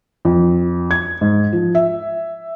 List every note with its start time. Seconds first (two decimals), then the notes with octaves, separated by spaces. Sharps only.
0.25 F2
0.91 G#6
1.21 G#2
1.53 F3
1.75 E5